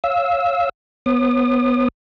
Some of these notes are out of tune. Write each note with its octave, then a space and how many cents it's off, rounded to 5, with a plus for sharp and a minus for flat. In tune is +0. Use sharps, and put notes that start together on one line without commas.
C#5 +0 F5 -5 E6 -15
B3 +0 C#5 -40 D#6 -35